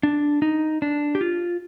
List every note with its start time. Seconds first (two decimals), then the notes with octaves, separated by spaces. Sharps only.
0.03 D4
0.42 D#4
0.82 D4
1.15 G4
1.21 F4